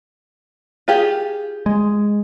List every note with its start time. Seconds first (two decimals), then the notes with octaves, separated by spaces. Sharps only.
0.88 F4 G4 G#4
1.66 G#3